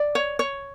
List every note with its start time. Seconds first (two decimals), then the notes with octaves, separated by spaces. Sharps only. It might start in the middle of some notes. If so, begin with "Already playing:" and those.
Already playing: D5
0.15 C#5
0.39 C#5